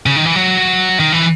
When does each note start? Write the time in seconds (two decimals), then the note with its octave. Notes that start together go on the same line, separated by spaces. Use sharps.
0.06 C#3
0.16 D#3
0.25 E3
0.35 F#3
1.00 D#3
1.12 E3